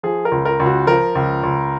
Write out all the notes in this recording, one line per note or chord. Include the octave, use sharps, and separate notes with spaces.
F3 G#4
A#4
C#2
A#4
C#2
F#4
F3 A#4
C#2
C#2